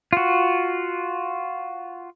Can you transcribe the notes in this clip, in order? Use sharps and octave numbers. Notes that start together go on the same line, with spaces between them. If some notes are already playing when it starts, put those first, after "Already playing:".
F4 F#4